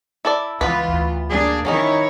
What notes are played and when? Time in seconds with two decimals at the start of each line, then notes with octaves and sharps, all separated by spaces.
0.25 E4 A4 D5
0.61 C#2 E3 B3 F4 B4
0.93 D2
1.29 A#3 D4 G#4
1.65 D#3 F#3 C#4 D#4 E4 C#5